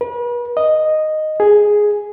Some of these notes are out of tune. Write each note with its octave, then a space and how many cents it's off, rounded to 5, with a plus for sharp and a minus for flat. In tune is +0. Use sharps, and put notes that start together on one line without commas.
B4 -40
D#5 -5
G#4 +0